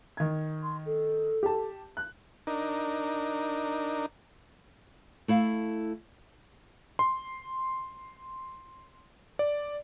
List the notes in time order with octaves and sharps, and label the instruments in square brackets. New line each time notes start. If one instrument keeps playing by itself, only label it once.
[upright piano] D#3 G#6
[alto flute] C6
A4
[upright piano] G4 A5
F#6
[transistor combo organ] D4 D#4 A#4
[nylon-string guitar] A3 E4 F5
[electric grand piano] C6
D5